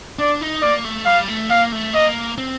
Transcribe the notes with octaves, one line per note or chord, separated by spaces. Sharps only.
D4 D5
D#4
A#3 D5
A3
G3 F5
A3
A#3 F5
A3
A#3 D#5
C4